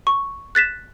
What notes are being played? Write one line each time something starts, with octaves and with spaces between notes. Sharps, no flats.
C#6
F#6 A6 B6 E7